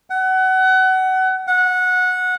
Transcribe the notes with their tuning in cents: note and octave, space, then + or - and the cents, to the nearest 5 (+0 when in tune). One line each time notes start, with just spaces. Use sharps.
F#5 +25
F#5 -15